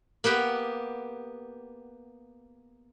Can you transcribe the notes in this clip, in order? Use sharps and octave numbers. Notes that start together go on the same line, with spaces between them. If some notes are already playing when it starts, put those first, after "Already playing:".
A#3 B3 G4 F#5